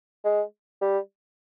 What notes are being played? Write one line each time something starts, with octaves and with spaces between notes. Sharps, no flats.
G#3
G3